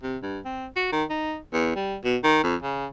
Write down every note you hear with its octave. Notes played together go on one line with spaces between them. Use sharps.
C3
G2
C4
F#4
D#3
D#4
E2
G3
B2
D#3
F2
C#3